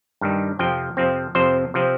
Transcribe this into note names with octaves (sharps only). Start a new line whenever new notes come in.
G2 D#3 G3
F2 C3 F3 C4 G5
F2 C3 F3 C4
F2 C3 F3 C4 C5
C3 F3 C4